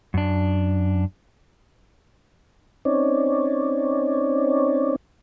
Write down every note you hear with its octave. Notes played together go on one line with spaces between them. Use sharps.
F#2 D4
C4 C#4 D#4 C#5 D5